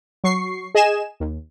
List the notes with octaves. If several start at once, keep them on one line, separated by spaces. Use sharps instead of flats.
F#3 C#6 C7
G#4 D#5 G#5 E7
D#2